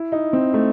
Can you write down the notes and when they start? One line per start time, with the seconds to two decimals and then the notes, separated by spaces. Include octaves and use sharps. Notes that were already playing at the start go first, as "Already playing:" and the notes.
Already playing: E4
0.12 D#4
0.33 C4
0.54 A3